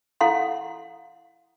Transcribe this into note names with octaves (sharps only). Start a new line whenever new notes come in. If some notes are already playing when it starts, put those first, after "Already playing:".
E4 A4 F5 F#5 C6